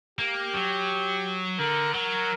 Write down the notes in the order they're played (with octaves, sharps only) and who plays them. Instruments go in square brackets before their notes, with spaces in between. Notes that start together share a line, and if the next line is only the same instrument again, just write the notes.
[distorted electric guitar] A#3 [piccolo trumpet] G4
[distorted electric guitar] F#3
[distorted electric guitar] D3 [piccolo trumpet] A#4
[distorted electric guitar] F#3 [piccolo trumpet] A#4